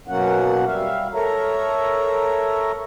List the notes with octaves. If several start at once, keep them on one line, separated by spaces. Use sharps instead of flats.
F#2 B2 F#3 A#3 C#4 F#5
G3 E5 F5
A4 A#4 C#5 E5 A#5